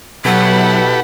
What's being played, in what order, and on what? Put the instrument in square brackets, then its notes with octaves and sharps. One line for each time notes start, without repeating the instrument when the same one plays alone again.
[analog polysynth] B2 [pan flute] F#3 [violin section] E4 F#5 [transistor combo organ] G4 A4 B4